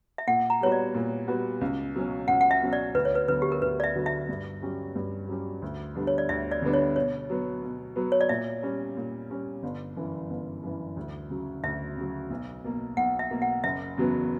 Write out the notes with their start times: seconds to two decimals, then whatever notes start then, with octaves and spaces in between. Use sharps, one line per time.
0.18 E5
0.27 A#2 F#5
0.50 A#5
0.61 G3 B3 F#4 C#5
0.72 D5
0.94 A#2
1.28 G3 B3 F#4
1.61 C#2
1.95 B2 F#3 C#4
2.28 C#2 F#5
2.41 F#5
2.51 E5
2.62 B2 F#3 C#4
2.73 D5
2.94 D2 B4
3.05 C#5
3.15 B4
3.28 D3 F#3 B3 F#4 B4
3.42 G4
3.52 A#4
3.62 D2 B4
3.80 D5
3.84 E5
3.95 D3 F#3 B3 F#4
4.06 E5
4.29 G2
4.62 F#3 C#4 G4
4.95 G2
5.29 F#3 C#4 G4
5.62 D2
5.95 D3 G3 B3 D4
6.07 C#5
6.18 D5
6.29 D2 E5
6.51 D5
6.62 D3 G3 B3 D4
6.73 C#5
6.96 B2 C#5
7.30 F#3 B3
7.62 B2
7.96 F#3 B3
8.12 C#5
8.21 D5
8.29 A#2 E5
8.63 G3 C#4
8.97 A#2
9.30 G3 C#4
9.63 G1
9.97 F#2 E3
10.30 G1
10.63 F#2 E3
10.97 D2
11.30 C#3 F#3
11.63 D2 E5
11.97 C#3 F#3
12.30 B1
12.64 B2 A#3
12.97 B1 F#5
13.19 E5
13.31 B2 A#3
13.42 F#5
13.64 F#1 E5
13.97 E2 C#3 F#3 B3